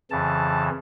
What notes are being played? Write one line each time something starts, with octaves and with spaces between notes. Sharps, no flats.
F2 C#3 E3 A5